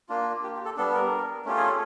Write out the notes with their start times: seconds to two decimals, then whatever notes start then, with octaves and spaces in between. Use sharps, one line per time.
0.09 A#3 D4 F4
0.43 G4
0.55 G4
0.65 A4
0.77 G3 B3 D4 A4
0.94 A#4
1.45 A3 C#4 F4 G4
1.57 G#4
1.63 A4